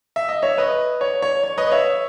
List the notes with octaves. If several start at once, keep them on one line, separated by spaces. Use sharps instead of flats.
E5
D#5
C#5 E5
B4 D#5
C#5
C#5
C#5
B4 D#5
C#5 E5